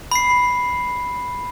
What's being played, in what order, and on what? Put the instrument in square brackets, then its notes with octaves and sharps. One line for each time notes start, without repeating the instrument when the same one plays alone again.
[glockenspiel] B5 C7